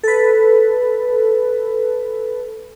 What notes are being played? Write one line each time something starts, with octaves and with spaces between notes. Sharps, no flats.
A4 B4